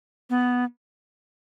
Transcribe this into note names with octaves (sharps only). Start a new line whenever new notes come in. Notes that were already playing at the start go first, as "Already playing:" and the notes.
B3